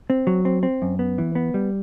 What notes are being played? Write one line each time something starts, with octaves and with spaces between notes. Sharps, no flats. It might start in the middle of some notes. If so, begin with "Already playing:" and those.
C4
F#3
C4
C4
F#2
B3
E3
B3
G3